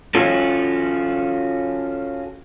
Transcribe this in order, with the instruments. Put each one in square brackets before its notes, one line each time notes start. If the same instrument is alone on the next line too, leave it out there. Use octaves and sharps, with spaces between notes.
[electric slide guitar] C#4 F4 F#4 A4